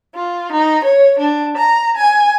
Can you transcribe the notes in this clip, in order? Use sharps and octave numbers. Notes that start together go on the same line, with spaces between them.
F4
D#4
C#5
D4
A#5
G#5